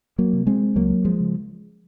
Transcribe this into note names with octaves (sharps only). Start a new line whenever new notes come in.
F#3 A#3
C3
G#3 C4
C#2 F#3 A#3
F3 G#3
C#3